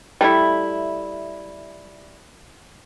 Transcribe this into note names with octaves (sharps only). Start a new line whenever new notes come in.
G3 A3 E4